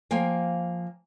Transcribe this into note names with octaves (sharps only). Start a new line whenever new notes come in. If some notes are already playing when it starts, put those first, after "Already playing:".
F3 A#3 G5 G#5